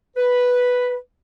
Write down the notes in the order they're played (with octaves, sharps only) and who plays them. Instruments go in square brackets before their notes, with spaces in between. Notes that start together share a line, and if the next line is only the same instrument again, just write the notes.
[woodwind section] B4